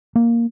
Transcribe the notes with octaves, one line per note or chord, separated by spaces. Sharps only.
A#3